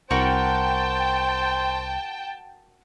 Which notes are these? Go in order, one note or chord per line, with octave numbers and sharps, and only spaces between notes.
C2 F#4 A#4 C5 G5 A5 C#6